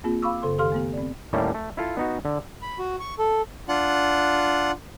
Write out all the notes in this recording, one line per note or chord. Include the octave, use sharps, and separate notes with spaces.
A#3 C4 F4 G#4
F5 B5 C#6 D6 E6
F#2 C#3 A4 C6
D#3 G4 A4 F5 C6 F6
A3 B3 G4
C4 D5
D#2 A2 G3 A3 A#3 C#4
A3
E4 F4 A4
B3 D#4 F#4
D3
B5
F#4
C#6
A4
D4 F4 F#5 F#6